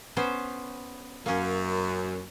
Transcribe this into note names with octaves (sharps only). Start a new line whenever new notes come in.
B3 C#4 C5
F#2 A#3 C#4